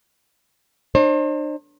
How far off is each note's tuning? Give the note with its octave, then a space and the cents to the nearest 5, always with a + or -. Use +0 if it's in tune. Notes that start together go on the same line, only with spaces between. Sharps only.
D4 +45 C5 +40